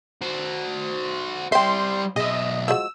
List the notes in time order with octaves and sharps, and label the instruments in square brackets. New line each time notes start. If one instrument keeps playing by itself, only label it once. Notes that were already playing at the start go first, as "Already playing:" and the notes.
[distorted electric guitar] F#4 C5
[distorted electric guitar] G3 C5 [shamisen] E5 G5 [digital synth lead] C6
[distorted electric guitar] B1 E5 [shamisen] G#4 [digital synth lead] D#5
[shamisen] F3 G#3 F#4 [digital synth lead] E6